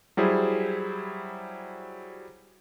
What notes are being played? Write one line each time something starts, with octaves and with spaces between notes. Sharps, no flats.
F#3 G3 E4 G#4 C5